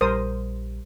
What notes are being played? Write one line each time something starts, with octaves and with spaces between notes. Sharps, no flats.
A#1 G3 A#4 C5 D#6